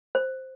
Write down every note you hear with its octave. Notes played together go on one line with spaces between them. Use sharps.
C5